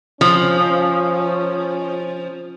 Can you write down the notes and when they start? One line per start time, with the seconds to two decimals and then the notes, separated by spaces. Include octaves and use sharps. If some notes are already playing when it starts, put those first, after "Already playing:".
0.21 F3 C#4